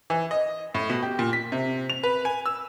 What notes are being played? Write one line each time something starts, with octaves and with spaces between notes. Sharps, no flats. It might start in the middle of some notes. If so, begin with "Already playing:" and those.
E3
D#5
A2
B2
G4
A#2
B6
C3
F7
B4
G#5
E6